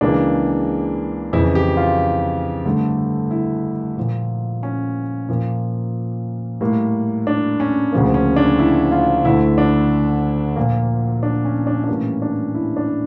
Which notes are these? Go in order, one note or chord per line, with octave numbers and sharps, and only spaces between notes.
C#2 C#3 E3 A#3 D4
F2 C#3 E3 E4
G4
F4
G2 D3 A3
E4
A#2 F3 A#3
C#4
A#2 F3 A#3
A2 G3 A#3
D4
C#4
D2 C#3 F3 A#3
C#4
D4
E4
F4
D2 D3 A3 E4
D4
A#2 F3 A#3
D4
C#4
D4
D4
A2 E3 G3 A#3 C#4
D4
E4
D4